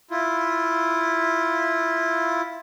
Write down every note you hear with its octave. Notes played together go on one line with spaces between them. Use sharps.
E4 F4